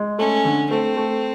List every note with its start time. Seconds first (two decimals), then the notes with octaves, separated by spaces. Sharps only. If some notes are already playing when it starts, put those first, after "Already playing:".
Already playing: G#3
0.19 A3 C#4
0.45 D3
0.71 A3 C4
0.97 A3